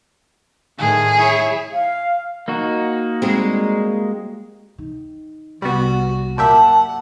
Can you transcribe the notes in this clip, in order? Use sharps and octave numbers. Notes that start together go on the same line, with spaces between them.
A2 D#3 G#4
E4 C#5
F5
A#3 D#4 F#4
G3 G#3 C4
D#3
C2 G3 B3 F#4
F#2 A#2 G4 E5 F#5 A5